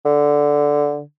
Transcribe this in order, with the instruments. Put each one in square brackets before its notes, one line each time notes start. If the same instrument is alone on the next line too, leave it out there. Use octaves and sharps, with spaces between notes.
[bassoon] D3